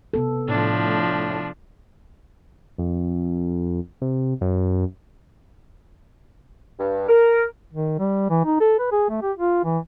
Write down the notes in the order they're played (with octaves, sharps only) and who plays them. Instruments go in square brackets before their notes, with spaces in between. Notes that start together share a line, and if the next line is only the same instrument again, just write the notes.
[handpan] C3 B3 A4
[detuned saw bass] A2 [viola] F3 D4
[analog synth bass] F2
C3
F#2
[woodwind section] G2
A#4
[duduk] D#3
G3
E3
D#4
A4
B4
G#4
A3
G4
F4
E3